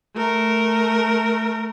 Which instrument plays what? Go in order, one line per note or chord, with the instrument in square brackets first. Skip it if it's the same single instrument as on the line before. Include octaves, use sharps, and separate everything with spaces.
[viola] A3 A#4